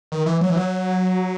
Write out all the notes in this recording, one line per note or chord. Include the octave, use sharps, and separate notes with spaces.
D#3
E3
F#3
E3
F#3